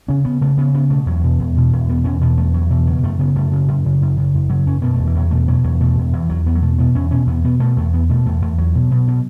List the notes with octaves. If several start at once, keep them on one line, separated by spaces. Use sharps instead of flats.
C#3 C#4
C#3 B3
C#3 A3
C#3 B3
C#3 B3
B2 A3
E2 F#3
B2
E2
B2
E2
B2 B3
E2 C#4
B2 B3
E2 A3
E2 F#3
B2 E3
C#3 F#3
F#2 A3
C#3 B3
F#2 A3
C#3
F#2
C#3
F#2
C#3
F#2
C#3 F#3
F#2 C#4
B2 B3
E2 A3
E3
E2 F#3
B2 A3
B2 F#3
E2 F#3
B2 A3
E2
E2 E3
E2 F#3
E2 B3
F#3
B2 A3
B2 B3
E2 C#4
B2 C#4
E2 B3
B2 B3
B2 A3
E2 A3
E2 B3
B2 A3
E2 A3
E2 A3
E2 F#3
B2
B2
B2